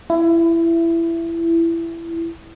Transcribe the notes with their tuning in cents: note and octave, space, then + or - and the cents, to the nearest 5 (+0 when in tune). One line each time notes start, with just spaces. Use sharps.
E4 +20